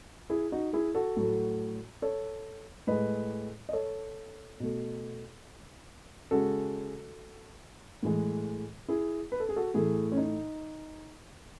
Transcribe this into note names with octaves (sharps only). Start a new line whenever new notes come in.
E4 G#4
D#4 F#4
E4 G#4
F#4 A4
A2 F#3 A3
A4 C#5
A2 G#3 B4 D#5
D#5
A4 C#5
B2 A3
C#3 G#3 F#4 A4
A2 E3 G#3
E4 G#4
B4
A4
G#4
F#4 A4
A2 E3 A3 E4 G#4
C#4
D#4